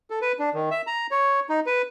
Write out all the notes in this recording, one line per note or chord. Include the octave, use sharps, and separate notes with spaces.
A4
B4
D4
D#3
E5
A#5
C#5
D#4
B4